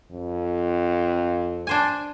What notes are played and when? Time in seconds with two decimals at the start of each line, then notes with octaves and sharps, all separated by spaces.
0.11 F2
1.67 D4 C5 G#5